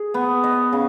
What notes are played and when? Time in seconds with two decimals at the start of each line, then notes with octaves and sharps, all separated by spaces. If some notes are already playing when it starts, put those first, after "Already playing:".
Already playing: G#4
0.14 B3
0.44 D#5
0.73 C#3